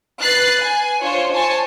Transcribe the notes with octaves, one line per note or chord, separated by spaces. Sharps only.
B4 F#6 A6 C7
G#5
D4 F4 C5 C#5
C5 C#5 G#5 A5